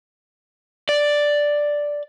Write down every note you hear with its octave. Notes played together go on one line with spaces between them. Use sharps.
D5